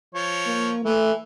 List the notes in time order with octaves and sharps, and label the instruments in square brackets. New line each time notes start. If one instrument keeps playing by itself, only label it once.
[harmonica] F3 C#5
[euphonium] A#3
[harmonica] E3 [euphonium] A3